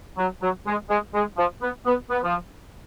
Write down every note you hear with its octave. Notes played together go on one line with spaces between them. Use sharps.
F#3
F#3
G#3
G#3
G#3
F3
B3
B3
B3
F3